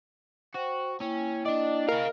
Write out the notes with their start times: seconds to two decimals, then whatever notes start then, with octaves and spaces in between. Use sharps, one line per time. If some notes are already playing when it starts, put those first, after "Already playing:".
0.54 F#4 C5 G5
1.00 A#3 C#4 E4 G5
1.46 D4 D5 D#5
1.89 G#4 A#4 F5